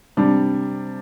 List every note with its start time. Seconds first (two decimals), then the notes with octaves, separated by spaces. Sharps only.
0.17 C3 G3 D4